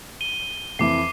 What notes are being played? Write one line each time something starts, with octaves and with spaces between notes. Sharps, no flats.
D#7 G7
F2 E3 D6 C7